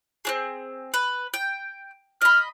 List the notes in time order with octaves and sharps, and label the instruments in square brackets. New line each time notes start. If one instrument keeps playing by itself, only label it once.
[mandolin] C4 D4 G#4
B4
G5
[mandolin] D#5 B5 [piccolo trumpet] F6